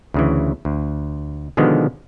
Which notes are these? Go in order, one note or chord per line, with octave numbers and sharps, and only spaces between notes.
D2 C#3 E3
D2
B2 D3 D#3 F3 G#3 B3